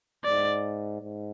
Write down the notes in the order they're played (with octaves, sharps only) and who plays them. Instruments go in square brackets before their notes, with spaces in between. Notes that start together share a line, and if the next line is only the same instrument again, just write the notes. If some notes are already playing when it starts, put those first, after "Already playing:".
[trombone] G#2 [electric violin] D5
[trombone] G#2